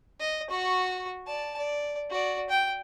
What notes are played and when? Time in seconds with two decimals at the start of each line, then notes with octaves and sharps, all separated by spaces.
0.20 D#5
0.50 F#4 C#6
1.27 D5 A5
1.57 D5
2.10 F#4 D5
2.50 G5